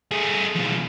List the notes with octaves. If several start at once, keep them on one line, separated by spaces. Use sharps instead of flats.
A3 G#4
F2 B2